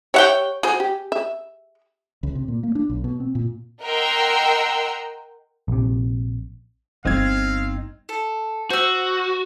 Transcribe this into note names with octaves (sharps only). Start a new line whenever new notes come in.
G4 C#5 E5 F#5 G5
F#4 G#4 C5
G4
E5
C#2
C3
A#2
A#3
D4
B1
B2
C4
A#2
A#4 D#5 F#5 G5 C6 E6
A#1 C3
G1 C4 D#4 F5 G#6
A4
F#4 C5 E6